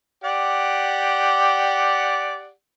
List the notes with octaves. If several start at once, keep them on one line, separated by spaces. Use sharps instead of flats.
G4 D5 F#5